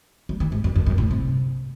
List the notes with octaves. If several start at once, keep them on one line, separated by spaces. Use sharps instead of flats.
F#3
D#3
G#2
F#2
F#2
F#2
A2
C3